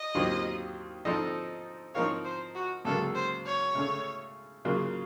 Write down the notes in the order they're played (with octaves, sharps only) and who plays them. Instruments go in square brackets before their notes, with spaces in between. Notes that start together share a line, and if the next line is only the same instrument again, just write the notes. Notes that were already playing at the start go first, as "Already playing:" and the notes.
Already playing: [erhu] D#5
[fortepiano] D#2 D#3 F#3 C4 F4
F3 C4 D#4 A4 D#5
[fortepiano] F3 C4 D#4 A#4 F5 [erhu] C#5
[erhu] C5
F#4
[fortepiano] C#2 C#3 F#3 A#3 [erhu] A4
[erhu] C5
C#5
[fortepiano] C#3 A3 C#4 A4
C#3 F#3 A#3 F4